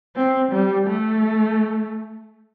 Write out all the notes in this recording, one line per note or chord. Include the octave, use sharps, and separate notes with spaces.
C4
G3
A3